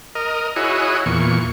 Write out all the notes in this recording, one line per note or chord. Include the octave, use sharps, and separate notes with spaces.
A#4 D#5
E4 F#4 G#4 C#5 D#5
E2 A#2 C#6